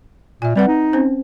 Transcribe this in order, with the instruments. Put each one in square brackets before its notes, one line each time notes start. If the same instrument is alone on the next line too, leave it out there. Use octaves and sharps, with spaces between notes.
[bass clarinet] A#2 [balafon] E5 G#5
[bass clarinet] G3 [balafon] C4 B4 F#5
[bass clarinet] D#4
[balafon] C4 C#4 C5